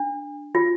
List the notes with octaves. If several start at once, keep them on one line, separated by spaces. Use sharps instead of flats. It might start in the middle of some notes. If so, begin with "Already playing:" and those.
Already playing: D4
F4